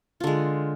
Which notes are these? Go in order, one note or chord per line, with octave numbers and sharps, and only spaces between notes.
D3 G#3 F4